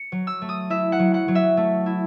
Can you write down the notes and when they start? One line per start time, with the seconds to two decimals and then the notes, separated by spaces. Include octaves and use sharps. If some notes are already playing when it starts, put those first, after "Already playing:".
Already playing: C#7
0.12 F#3
0.27 E6
0.42 A3
0.49 D#6
0.70 E4 E5
0.92 F#5
0.99 F#3
1.14 F#5
1.28 F#3
1.35 E5
1.57 A3
1.86 E4